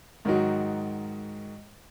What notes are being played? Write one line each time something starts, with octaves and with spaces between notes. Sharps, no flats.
G#2 D#3 F#3 D#4 F#4